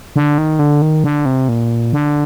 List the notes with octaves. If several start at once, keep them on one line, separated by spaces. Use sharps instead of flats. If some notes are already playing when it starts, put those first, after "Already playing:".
D3
D#3
D3
D#3
D3
C3
A#2
D3